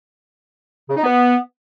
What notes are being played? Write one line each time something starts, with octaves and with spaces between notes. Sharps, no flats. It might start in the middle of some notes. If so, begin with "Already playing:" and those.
C#3
D#4
B3